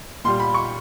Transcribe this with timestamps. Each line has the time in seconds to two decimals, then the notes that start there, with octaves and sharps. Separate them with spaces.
0.25 A#2 G3 C6
0.40 B5
0.54 C#6